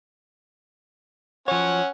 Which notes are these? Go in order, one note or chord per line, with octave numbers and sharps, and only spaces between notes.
F3 C#4 C#5 F#5